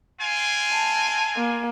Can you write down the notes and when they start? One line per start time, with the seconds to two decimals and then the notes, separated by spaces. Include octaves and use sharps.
0.20 C4 F4 G#5
0.72 A5
1.37 A#3